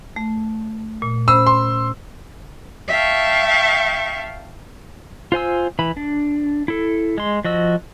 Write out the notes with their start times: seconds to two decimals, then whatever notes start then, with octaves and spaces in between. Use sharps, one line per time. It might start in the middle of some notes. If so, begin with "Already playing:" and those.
0.16 A3
1.02 A#2
1.28 C#4 C5 B5 E6
1.47 C6
2.89 E5 F5 G5 A5 C#6
5.32 F4 C5 G#5 E6
5.79 E3 B5
5.97 D4
6.68 E4 A4
7.18 G#3 C6
7.45 F3 F#4 D#5 E6